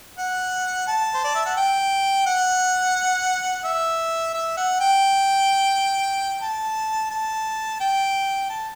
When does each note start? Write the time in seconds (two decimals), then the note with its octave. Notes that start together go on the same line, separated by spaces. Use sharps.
0.18 F#5
0.87 A5
1.14 C5
1.24 D5
1.35 E5
1.46 F#5
1.57 G5
2.26 F#5
3.64 E5
4.34 E5
4.57 F#5
4.80 G5
6.42 A5
7.11 A5
7.80 G5
8.50 A5